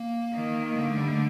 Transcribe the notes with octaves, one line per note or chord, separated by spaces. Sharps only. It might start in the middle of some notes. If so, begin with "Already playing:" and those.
Already playing: A#3
D#3
D3 A#3
A3
G3
A3